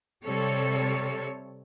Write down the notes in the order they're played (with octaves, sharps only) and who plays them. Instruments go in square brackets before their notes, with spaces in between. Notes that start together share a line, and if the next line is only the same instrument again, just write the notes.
[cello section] C3 G3 A4 C#5